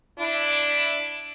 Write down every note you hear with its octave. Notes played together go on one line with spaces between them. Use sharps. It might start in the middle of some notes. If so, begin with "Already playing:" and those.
D4 E4